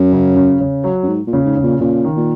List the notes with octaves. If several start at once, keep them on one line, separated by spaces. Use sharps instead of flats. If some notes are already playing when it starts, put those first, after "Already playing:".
Already playing: F#2
C#3
C#3
C#3
F#3
F#2
G#2
A#2
C#3
G#2
C#3
A#2
A#2 C#3
D#3
A#2